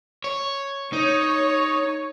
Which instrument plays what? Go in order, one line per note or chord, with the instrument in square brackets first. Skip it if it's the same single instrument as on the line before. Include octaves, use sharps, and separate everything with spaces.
[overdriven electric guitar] C#5
[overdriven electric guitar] D#4 [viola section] C#5